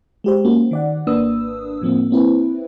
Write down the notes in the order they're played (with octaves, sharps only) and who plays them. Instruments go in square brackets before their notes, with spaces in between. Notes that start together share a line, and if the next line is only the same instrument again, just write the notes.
[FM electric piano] G#3 G4 C5
A#3 C#4 F#4
D#3 D5 F#5
G#1 A#3 D4 B4 D#6 E6
A2 F3 A#3 C4
A#3 C4 E4 B4